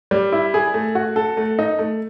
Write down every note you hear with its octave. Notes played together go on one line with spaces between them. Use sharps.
G3
E4
G#4
A3
F#4
A4
A3
D#4
A3